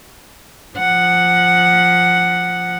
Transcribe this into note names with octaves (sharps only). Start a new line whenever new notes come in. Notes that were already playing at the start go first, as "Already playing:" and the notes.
F3 F#5